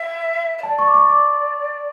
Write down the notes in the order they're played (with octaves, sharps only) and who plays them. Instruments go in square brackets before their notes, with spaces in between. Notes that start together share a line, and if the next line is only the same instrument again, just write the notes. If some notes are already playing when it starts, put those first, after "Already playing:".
Already playing: [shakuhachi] E5
E5
[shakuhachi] D5 [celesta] A5
[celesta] C#6
D6
C#6
D6